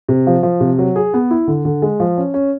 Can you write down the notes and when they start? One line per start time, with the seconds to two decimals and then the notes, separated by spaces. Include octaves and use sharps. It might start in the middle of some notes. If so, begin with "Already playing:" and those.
0.09 C3
0.27 F3
0.43 F3
0.60 C3
0.79 F#3
0.96 G#4
1.14 B3
1.31 E4
1.47 D3
1.65 D3
1.82 G#3
2.00 F3
2.17 C#4
2.34 C#4